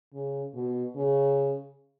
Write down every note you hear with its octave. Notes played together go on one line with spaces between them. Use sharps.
C#3
B2
C#3